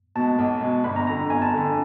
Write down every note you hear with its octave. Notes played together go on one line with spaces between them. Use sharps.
B2 G#3 A5
B1
B2 G#3
G1 B5
A#5
F2 D3 A#5
G1 G#5
A5
F2 D3